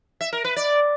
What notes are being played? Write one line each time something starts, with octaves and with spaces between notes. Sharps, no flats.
E5
A#4
B4
D5